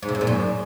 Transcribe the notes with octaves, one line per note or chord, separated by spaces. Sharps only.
G#2
C3
G#2
A#2
F#2